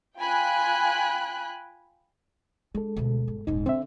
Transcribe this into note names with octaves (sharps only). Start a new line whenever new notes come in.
F4 G5 G#5 B5 F#6
G#3 D4 A4
D2 B2
G1
D#1 G#2 D#4
D3 C4 E5